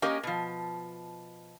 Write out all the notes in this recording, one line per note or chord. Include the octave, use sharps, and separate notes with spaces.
A#3 C#4 G4 A#4 D#5 G#5
B2 F3